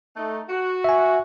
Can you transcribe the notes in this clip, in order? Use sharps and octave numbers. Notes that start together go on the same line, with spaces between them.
A3 D#4
F#4
E5 G#5